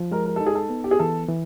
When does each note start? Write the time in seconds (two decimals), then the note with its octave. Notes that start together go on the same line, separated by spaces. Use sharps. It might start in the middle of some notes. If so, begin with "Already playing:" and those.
Already playing: F3
0.12 G#3 A#4
0.26 A#4
0.36 D#4 A4
0.46 G#4
0.55 A4
0.70 B3
0.84 G4
0.91 G#4
0.99 E3 A4
1.29 E3